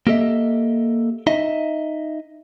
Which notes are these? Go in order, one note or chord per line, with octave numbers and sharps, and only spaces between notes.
A#3 G4 A4 D#5 E5
D#4 D#5 E5